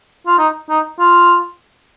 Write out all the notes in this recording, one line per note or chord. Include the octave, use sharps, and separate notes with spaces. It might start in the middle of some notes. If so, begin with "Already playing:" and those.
F4
D#4
D#4
F4